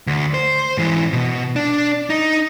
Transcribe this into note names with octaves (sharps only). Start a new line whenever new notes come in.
D2
C5
G#2 E3
B2
D4
D#4